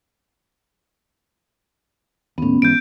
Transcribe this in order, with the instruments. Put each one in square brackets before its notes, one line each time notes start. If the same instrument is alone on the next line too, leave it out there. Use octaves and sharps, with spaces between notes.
[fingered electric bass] D#2 A2 [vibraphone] B3 C#4
[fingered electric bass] G#2 E3 [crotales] G6 D7